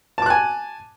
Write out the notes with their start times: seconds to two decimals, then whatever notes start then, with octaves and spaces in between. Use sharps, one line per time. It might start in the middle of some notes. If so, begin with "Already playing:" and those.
0.18 A5
0.22 D6
0.26 F#6
0.30 G#5